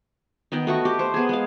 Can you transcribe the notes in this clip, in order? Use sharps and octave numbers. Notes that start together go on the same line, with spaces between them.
D#3 B3 D#5 G5
A3 F#4 C#6
G4
C5
B3 G#4
G#3 F5